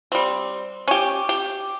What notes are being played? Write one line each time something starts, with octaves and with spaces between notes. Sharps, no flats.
G3 C4
C#4 G4
G4